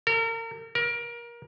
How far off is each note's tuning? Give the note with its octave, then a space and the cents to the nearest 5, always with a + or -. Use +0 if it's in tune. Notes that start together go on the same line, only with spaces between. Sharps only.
A#4 -35
A#4 +25